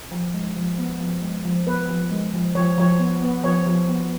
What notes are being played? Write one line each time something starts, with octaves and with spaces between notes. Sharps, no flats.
F3
G#3
F3
B3
F3
G#3
F3
B3 B4
F3
G#3
F3
F3 C#5
F3 C#5
B3
B3
F3 C#5
F3
B3